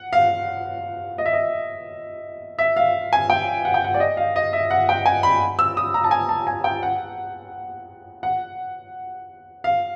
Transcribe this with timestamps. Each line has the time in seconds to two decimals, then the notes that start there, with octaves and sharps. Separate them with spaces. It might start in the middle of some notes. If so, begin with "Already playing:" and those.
Already playing: F#5
0.13 F5
1.18 D#5
1.26 E5
1.33 D#5
2.59 E5
2.76 F5
3.13 G#5
3.30 G5
3.65 F#5
3.74 G5
3.84 F#5
3.94 D5
4.00 D#5
4.17 F5
4.36 D#5
4.53 E5
4.71 F#5
4.89 G5
5.06 G#5
5.23 B5
5.59 E6
5.77 D#6
5.94 A#5
6.04 A5
6.11 G#5
6.29 A5
6.47 G#5
6.64 G5
6.83 F#5
8.23 F#5
9.64 F5